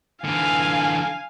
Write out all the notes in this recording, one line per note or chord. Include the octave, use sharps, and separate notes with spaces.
D3 E3 F5 G#5